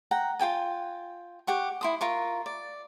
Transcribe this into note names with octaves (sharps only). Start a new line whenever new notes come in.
F#5 G5 A#5
F4 F#4 G5 G#5
G4 F#5 C#6
E4 C6 D#6
F4 A#4 C#6
D5